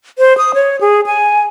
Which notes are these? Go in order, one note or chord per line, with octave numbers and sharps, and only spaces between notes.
C5
D#6
C#5
G#4
G#5